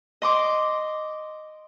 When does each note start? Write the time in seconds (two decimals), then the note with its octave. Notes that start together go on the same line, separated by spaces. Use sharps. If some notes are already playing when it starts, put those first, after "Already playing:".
0.22 D#5 C6 D6